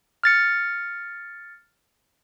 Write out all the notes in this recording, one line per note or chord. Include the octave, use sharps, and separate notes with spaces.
F6 A6 C#7